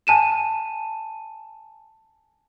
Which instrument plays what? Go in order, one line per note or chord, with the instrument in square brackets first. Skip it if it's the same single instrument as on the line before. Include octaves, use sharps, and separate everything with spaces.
[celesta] G#5 A5 D#7 E7